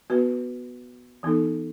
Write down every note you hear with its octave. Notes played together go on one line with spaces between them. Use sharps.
B3 F#4 B4
E3 B3 D#4 A4